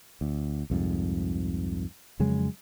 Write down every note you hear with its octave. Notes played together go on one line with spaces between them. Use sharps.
D2
C2 F2 G#2
F2 C#3 F#3 G#3